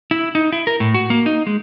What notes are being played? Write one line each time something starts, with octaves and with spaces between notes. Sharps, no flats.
E4
D#4
E4
A#4
A2
F#4
A#3
D#4
G#3